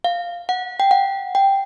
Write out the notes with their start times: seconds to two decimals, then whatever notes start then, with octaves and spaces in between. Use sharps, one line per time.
0.04 F5
0.49 F#5
0.80 G5
0.91 F#5
1.35 G5